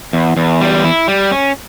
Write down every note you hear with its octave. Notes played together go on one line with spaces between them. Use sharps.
E2
E2
G3
E4
G3
C#4